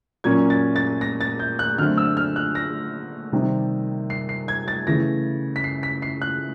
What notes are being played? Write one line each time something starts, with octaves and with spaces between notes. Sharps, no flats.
A#2 F#3 A#3 C#4 G#6
A6
A6
A#6
A6
G6
F#6
D3 F#3 A3 C4 F6
E6
F6
F#6
A#6
C3 D#3 G3 C4
C7
C7
G#6
A6
C#3 E3 A3 A#6
B6
C7
B6
C7
F#6